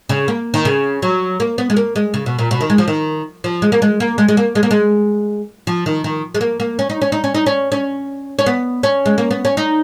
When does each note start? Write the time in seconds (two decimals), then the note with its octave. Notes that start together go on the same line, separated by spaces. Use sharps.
0.09 C#3
0.28 A#3
0.54 D#3
0.65 C#3
1.02 F#3
1.40 A#3
1.58 B3
1.70 G#3
1.77 A#3
1.96 G#3
2.14 C#3
2.26 B2
2.39 A#2
2.51 B2
2.61 D#3
2.70 G#3
2.78 F3
2.88 D#3
3.44 F3
3.62 G#3
3.72 A#3
3.82 G#3
4.00 A#3
4.18 G#3
4.28 G#3
4.37 A#3
4.55 G#3
4.63 A#3
4.71 G#3
5.67 F3
5.86 D#3
6.04 D#3
6.35 G#3
6.41 A#3
6.60 A#3
6.79 C#4
6.90 D#4
7.02 C#4
7.12 D#4
7.24 C#4
7.34 D#4
7.46 C#4
7.72 C#4
8.39 C#4
8.46 B3
8.83 C#4
9.06 G#3
9.18 A#3
9.31 B3
9.45 C#4
9.57 D#4